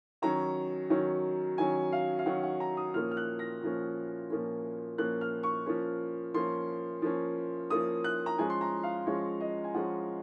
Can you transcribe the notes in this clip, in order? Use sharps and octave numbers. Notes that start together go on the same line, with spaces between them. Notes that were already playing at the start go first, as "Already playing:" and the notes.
D#3 F#3 C#4 A#5
D#3 F#3 C#4
D#3 F#3 C#4 G#5
F5
F5
D#3 F#3 C#4 F#5
F#5
A#5
D#6
A#2 F3 A#3 C#4 F6
F6
F#6
A#6
A#2 F3 A#3 C#4
A#2 F3 A#3 C#4
A#2 F3 A#3 C#4 F#6
F6
C#6
F3 A#3 C#4
F3 A#3 C#4 C6
F3 A#3 C#4
F3 A#3 C#4 D#6
F#6
A#5
F3 G#3 C#4 G#5
C6
A#5
F5
F3 G#3 C#4 C#5
D#5
G#5
F3 G#3 C#4 F#5